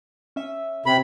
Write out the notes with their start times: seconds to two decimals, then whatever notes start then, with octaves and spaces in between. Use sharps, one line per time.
0.36 C#4 E5
0.86 C3 B5